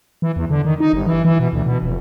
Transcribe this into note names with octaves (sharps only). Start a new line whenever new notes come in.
E3
E2
D3
D#3
D#4
G1
E3
E3
B2
D2
B2
F1